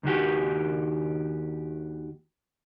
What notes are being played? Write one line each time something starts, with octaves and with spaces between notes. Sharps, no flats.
D#2 D#3 F#4 G4